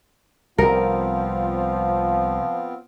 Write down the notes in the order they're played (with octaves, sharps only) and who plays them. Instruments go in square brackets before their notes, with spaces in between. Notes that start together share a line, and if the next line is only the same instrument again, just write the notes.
[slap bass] C2 [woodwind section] F3 [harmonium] B3 C4 F4 [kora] A#4